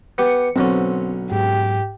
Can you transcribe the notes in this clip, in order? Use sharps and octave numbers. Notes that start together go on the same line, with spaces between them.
B3 G4 C#7
B1 D3 C4 C#4
G#2 G4